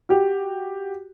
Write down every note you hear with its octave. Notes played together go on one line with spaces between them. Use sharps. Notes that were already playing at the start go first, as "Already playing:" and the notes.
F#4 G4